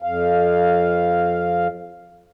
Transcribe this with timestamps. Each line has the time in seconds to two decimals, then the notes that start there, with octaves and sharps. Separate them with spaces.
0.02 F2 F5